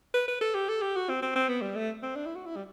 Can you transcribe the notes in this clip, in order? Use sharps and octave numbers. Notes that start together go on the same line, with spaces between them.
B4
B4
A4
G4
A4
G4
F#4
C4
C4
C4
B3
G3
A3
C4
D4
E4
F#4
E4
G3